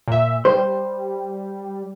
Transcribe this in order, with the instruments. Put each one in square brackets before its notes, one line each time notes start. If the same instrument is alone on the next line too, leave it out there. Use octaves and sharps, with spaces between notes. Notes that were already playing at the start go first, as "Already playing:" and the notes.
[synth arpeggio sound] A#2 E5
[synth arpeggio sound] G3 [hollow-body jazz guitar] C5